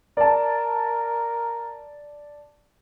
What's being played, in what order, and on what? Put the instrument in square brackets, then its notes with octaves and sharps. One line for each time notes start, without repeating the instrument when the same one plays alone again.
[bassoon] A#4 [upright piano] D5 A5